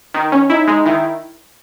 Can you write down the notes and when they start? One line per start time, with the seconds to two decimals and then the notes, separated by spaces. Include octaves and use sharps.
0.14 D#3
0.32 C#4
0.49 D#4 E4
0.68 G#3
0.85 D#3 E4